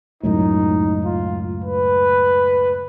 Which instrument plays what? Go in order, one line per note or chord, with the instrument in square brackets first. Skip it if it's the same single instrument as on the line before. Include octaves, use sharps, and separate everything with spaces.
[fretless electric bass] C#2 F#2 A2 [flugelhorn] D#4
[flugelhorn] F4
B4